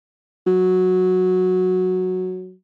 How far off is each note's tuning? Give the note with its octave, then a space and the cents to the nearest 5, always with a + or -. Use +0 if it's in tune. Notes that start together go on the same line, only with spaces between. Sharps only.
F#3 -5